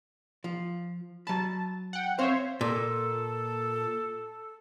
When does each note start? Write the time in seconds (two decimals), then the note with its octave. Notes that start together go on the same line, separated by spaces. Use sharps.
0.44 F3
1.27 F#3 A5 B5
1.93 F#5 G5
2.19 C4 C5 C#5 E5 F5
2.61 A#2 A4